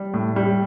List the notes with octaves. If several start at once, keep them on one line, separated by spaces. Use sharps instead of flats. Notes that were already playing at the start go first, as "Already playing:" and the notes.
Already playing: G3
A2
G3